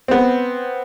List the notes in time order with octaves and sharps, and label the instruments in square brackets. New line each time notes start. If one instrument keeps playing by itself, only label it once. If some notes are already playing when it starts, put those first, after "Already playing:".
[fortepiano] B3 C4